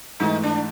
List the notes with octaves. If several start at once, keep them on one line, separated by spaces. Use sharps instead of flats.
G#2 E3 A3 D#4
D4